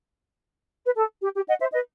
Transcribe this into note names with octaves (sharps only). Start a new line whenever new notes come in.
B4
A4
G4
G4
D#5 F#5
C5 E5
B4 D#5